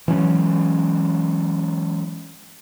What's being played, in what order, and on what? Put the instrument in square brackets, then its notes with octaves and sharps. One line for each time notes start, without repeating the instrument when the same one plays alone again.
[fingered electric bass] E3 F#3 G#3 C#4